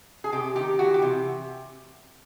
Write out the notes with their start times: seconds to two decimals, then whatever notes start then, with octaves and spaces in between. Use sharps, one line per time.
0.24 G#4
0.33 C3 G4
0.56 D#3 G4
0.79 E3 F#4
0.94 G4
1.02 C3